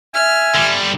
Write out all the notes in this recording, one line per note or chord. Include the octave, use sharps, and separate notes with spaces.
E5 G#5 F6
D3 G3